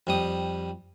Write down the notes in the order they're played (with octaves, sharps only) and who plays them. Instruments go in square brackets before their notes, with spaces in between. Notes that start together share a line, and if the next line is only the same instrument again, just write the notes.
[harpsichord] F2 G3 D#6